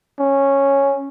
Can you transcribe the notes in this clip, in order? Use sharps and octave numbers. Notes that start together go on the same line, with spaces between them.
C#4